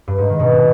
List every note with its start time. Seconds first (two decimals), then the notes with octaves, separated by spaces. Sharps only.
0.08 G2
0.18 G#2
0.29 D#3
0.39 B2